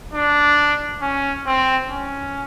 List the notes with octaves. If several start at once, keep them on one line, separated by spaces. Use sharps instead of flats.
D4
C#4
C4
C#4